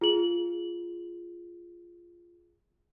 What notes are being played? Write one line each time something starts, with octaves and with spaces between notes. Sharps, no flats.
F4 G#4 F#7